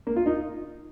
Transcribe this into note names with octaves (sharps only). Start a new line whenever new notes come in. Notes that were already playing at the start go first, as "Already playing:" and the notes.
A#3
F4
D#4